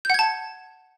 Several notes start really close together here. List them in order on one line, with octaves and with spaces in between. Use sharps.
G6 F#5 G#6 A5